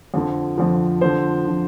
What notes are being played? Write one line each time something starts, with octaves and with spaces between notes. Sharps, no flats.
F2 D3 F3
F2 D3 F3
F2 D3 F3 C5
D3 F3